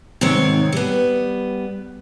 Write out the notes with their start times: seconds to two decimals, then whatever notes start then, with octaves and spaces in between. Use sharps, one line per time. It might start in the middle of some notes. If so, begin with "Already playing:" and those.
0.21 G#2 C3 D#3 C4 C#5
0.73 G3 B3